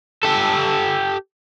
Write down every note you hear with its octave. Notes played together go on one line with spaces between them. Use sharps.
G4 A4